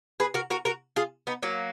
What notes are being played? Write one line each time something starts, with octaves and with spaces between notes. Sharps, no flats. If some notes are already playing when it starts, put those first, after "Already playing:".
G#4 B4
F#4 A#4
F#4 A#4
F#4 A#4
F4 G#4
B3 D#4
F#3 A#3